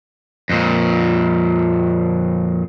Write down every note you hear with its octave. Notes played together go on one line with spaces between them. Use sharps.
F2 A#2